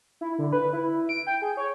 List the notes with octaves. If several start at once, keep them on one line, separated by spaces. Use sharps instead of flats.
E4
D3
B4
E4
D7
G5
G#4
C#5